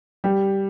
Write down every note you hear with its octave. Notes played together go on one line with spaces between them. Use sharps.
G3 G4